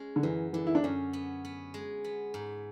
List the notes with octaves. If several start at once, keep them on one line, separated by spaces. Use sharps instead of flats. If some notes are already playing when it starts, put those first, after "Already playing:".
Already playing: G#3 C#4
D3
F#2 E3
D3 E3
E4
D4
F#2 C#4
B3
B3
G#3
B3
G#2